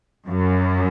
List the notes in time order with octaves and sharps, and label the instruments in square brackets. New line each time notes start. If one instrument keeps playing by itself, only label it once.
[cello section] F#2